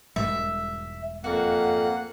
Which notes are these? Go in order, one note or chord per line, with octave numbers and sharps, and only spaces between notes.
E1 G#2 G3 E5
F2 A#3 F#4 F#5 F#6